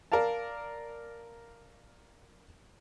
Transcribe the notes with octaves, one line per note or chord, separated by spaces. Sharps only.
A#4 D5 F5 A5